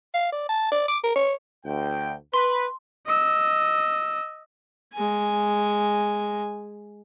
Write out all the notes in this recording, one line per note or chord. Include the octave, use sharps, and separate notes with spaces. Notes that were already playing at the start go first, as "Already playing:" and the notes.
F5
D5
A5
D5
D6
A#4
C#5
D2 G5
B4 C6
D#5 E6
G#3 G#5